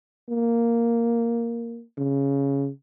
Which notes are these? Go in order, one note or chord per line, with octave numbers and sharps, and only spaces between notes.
A#3
C#3